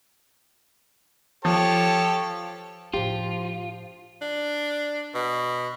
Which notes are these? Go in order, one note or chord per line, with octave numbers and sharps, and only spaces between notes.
F3 G4 A4 C#5
A2 F3 D4 F4 G4
D4
B2